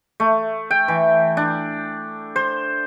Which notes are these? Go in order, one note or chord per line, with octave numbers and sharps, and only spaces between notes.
A3
G5
E3
D4
C5